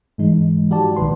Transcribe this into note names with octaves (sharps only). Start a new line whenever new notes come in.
G#2 E3 G#3 D#4
F3 F#4 G4 D5 A5
B1 A#2 D#3 B4 C6